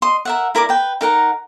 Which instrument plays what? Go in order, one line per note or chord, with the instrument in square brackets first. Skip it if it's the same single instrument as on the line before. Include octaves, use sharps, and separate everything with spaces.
[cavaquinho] D#5 C6
A#4 E5 F#5
E4 A#4 D5 D6
B4 G5
D#4 A#4 F#5 A#5